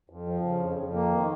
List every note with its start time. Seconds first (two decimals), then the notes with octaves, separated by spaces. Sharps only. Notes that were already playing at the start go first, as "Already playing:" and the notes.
0.10 F2
0.27 F3
0.44 C#3
0.60 F2
0.78 F2
0.94 A#3
1.11 D#3